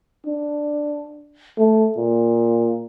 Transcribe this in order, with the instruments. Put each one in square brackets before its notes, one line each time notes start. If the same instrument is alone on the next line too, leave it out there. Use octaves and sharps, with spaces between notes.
[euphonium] D4
A3
A#2